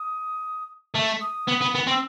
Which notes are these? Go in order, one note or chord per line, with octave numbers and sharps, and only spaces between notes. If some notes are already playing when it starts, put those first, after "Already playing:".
Already playing: D#6
A3
D#6
B3
B3
B3
C4
E6